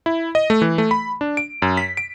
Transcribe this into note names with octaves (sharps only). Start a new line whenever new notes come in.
E4
D#5
A3
E3
A3
B5
D4
D7
F#2
B6
D7